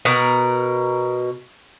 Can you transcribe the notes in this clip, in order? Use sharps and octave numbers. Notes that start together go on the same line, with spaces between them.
B2 A#4 F#5